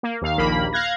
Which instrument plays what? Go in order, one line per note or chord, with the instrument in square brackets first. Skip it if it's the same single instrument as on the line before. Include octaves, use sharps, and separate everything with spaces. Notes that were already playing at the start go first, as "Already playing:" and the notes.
[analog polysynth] A#3
D#2 F5
A#1 D#2 A#3 B5
F5 F#6 G#6 A#6